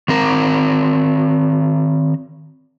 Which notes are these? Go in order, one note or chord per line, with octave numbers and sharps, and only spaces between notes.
D#3 C4 A#4